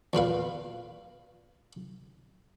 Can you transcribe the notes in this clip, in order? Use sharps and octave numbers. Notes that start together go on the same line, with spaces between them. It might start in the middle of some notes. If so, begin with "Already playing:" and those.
E2 A#2 B4 F5